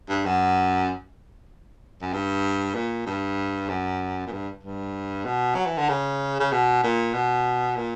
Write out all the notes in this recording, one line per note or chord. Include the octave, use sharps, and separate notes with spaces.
G2
F#2
F#2
G2
A#2
G2
F#2
A#2
G2
G2
B2
F#3
E3
D3
C#3
C#3
B2
A#2
B2
A#2